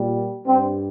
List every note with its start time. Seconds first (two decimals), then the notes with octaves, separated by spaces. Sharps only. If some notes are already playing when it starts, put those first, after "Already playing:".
Already playing: A#2 G3
0.45 G2 G3 C4